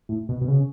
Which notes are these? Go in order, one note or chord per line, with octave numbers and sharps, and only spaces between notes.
A2
B2
B2
C#3